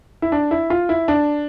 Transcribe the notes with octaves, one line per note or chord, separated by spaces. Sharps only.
E4
D4
E4
F4
E4
D4